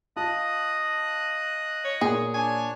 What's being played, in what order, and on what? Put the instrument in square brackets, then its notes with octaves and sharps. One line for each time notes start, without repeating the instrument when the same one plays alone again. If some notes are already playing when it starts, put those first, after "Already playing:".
[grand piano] F4 A5 [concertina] D#5 D#6 F#6
[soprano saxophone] C#5
[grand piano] A#2 [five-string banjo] G#4
[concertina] D4 C#5 [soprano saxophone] G#5